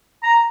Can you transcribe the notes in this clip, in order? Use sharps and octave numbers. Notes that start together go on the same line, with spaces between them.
A#5